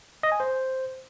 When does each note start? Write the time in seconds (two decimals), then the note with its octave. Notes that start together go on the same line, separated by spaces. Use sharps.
0.23 D#5
0.32 G#5
0.40 C5